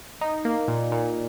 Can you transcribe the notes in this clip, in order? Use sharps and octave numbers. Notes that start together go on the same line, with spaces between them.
D#4
A#3
A#2
A#2